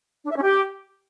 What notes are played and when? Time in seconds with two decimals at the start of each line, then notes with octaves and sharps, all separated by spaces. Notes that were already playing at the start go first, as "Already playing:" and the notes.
0.24 D4
0.30 E5
0.36 C#4
0.43 G4